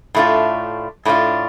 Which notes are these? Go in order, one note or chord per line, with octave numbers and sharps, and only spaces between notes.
A2 A3 D4 F4
A2 A3 D4 F4